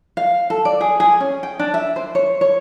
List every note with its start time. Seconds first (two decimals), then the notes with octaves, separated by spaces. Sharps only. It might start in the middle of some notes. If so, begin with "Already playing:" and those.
0.17 F5
0.50 A4
0.65 D5
0.81 G#4
1.00 G#4
1.20 C#4
1.43 G5
1.59 D4
1.74 E5
1.96 C5
2.15 C#5
2.41 C#5